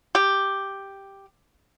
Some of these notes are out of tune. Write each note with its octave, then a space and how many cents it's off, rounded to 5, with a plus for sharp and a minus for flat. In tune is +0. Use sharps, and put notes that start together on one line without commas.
G4 +0